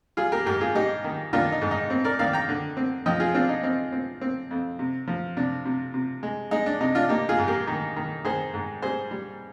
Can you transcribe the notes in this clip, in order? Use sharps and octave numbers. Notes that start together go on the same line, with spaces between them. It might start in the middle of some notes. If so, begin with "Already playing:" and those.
G3 F4 G#4
G4 A#4
G#2 G4 A#4
F4 G#4
G3 D#4 G4
D#3
D#3 D4 F4
D#4
G#2
D#4
C4
A#4 D5
D#3 D5 F5
G5 A#5
D3
C4
F3 D#5 G5
F4 G#4
C4 D4 F4
D#4
C4 D#4
C4
C4
F2
C3
F3
C3 D4
C3
C3
G#3
G#3 D#4
D4
C3 D#4
D4 F4
A#3 D#4 G4
F4 G#4
G#2
G4 A#4
D#3
D#3
D#3 G#4 C5
G#2
G3 G#4 C5
G3